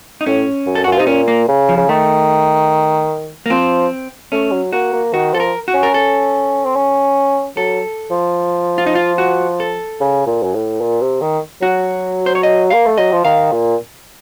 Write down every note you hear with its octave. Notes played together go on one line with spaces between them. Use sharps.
D#4
A2 C#4
F#2
A4
F#2 F#4
F4
C3 D#4
A#2 C#4
A#3
C#3
F3
C#3
D#3 A3
A#3
F3 C4
A3 C#4
F#3
A#3 F#4
A#3
D#3 F#4
F3 A4
A#4
F#4
C#4
A#4
A4
C4
C#4
F#3 A4
F3
F4
D#4
F4
F#4
A4
C#3
A#2
F#2
A2
A#2
C3
D#3
F#3 F#4
C5
C#5
D#5
A#3 F5
A3
F#3 D#5
F3
D#3 F5
A#2